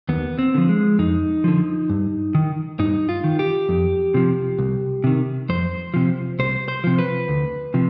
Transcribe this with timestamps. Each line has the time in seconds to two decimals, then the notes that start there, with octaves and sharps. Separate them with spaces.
0.09 D#2 B3
0.39 C4
0.54 D3 F3
0.69 G#3
0.99 F2 D#4
1.44 D3 F3
1.90 G2
2.35 D#3
2.79 G2 D#4
3.09 F4
3.24 D#3
3.39 G4
3.69 F2
4.14 C3 F3
4.59 C2
5.04 C3 D#3
5.49 F2 C5
5.94 C3 F3
6.39 C2 C5
6.68 C5
6.84 C3 F3
6.99 B4
7.28 D2
7.74 C3 F3